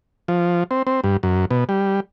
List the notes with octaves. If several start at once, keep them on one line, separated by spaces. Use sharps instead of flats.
F3
C4
C4
G2
F#2
B2
G3